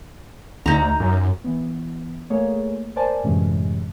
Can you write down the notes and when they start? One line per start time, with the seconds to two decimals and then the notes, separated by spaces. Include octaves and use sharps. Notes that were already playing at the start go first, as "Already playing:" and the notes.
0.66 D2 D#4 A#5
1.00 F#2
1.44 E3 B3
2.30 A3 A#3 G#4 C#5
2.96 A#4 C5 D5 G#5 A5
3.24 F#2 A2 C3 E3 G#3 C#4